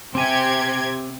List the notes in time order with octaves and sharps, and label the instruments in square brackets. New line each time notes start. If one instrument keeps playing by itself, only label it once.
[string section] C3 G4 G#6 [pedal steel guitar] C4 G#5